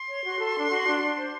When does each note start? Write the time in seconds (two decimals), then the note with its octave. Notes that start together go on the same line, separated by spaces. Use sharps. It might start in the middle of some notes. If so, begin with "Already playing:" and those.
Already playing: C6
0.09 C#5
0.25 F#4
0.39 A4
0.56 D4
0.71 F#4
0.87 D4
1.02 D4
1.18 C5